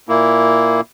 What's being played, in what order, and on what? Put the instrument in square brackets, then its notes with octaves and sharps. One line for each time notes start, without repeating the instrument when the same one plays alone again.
[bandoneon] A#2 A#3 E4